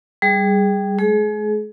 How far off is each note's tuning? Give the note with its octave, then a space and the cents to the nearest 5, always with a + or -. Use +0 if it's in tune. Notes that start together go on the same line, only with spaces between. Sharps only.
G3 +0 G#4 -5
G#3 +40 G#4 +30